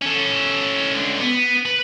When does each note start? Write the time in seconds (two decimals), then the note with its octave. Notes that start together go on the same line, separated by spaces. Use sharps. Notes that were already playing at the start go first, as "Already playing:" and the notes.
0.02 C#4 A4
0.93 C#2 D3
1.20 B3
1.66 B4